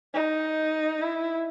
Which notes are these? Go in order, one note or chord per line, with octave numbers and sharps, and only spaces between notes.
D#4
E4